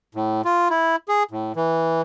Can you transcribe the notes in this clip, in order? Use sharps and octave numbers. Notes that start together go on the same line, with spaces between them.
A2
F4
E4
G#4
A2
E3